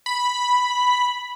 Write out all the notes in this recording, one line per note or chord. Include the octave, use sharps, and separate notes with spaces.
B5